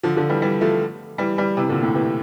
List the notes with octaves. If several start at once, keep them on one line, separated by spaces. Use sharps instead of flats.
D3 F3
D3 F3
E3 G3
E3 G3
F3 A3
E3 G3
E3 G3
C3 E3
A#2 D3
A2 C3
C3 E3